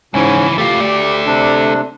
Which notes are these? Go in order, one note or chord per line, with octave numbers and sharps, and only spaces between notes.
C#2 G#2 E3 C#4
A3 F4 G4
A3 D5
C3 D4